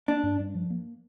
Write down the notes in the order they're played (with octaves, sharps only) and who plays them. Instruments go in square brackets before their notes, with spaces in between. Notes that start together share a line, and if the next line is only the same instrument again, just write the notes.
[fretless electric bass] A#3 [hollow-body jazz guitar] D4
[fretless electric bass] G2
G2
F3
A#3